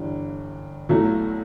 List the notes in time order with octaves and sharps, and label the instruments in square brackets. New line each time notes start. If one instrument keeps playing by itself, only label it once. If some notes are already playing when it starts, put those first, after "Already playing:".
Already playing: [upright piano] G1 G2 E3
B1 B2 F#3 A3 E4